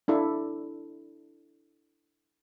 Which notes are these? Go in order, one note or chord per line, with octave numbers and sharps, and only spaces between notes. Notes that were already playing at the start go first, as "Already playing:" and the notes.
D4 E4 A4